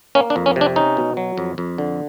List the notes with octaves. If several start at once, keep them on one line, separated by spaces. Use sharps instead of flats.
A#3 C#4
D4
F2
C#4
C3
D4
C#4 D#4
B2
F#3
F2
F2
D3